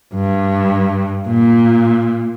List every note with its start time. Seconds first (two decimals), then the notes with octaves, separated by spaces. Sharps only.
0.14 G2
1.27 A#2